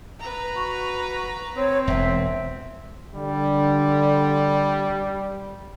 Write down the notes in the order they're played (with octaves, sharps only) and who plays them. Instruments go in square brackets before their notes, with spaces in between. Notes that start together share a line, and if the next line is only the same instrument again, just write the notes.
[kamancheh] B4 A#5
[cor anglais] F#4
[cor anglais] C4 [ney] C#5
[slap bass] E1 [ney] E5
[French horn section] D3 [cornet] G3